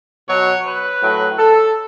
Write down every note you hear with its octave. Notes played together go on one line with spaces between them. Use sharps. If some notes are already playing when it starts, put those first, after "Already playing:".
B2 F#3 C#5
B4
A2 F#3
A4